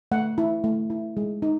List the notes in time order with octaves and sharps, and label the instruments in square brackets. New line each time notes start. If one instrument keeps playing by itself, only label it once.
[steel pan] A3 F#5
E4
A3
E4
G#3
D#4